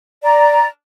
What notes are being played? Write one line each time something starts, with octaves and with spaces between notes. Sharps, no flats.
D5 A#5